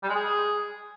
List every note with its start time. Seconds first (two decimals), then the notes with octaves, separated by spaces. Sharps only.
0.03 G3
0.09 G#3
0.15 G#4